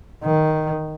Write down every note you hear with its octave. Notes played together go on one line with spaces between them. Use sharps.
D#3